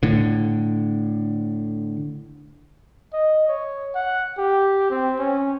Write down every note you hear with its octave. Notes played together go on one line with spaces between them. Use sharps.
A2 D3
D#5
C#5
F#5
G4
C4
C#4